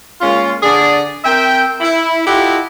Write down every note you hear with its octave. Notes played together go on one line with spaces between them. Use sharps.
G#3 A#3 C#4 F4
D3 G#4 D5
C4 A#4 E5 G5
E4
E4 F4 G4 A4 D#5 F#5